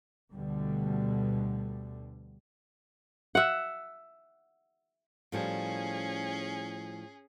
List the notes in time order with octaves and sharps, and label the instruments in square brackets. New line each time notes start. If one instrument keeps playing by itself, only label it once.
[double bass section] D2 B2 D3 G3
[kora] E5 F#5
[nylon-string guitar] A2 F3 G3 [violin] C#4 G#4